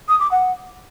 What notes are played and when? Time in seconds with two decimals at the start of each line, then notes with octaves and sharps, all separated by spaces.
0.09 D#6
0.20 D6
0.31 F#5